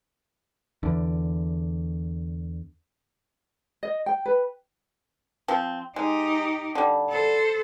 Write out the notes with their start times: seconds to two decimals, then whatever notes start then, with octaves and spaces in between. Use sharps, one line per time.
0.83 E2 D3
3.83 D#5
4.06 G5
4.26 B4
5.48 F3 C4
5.96 G#3 D#4 G4
6.75 D3 G3
7.09 A4 C5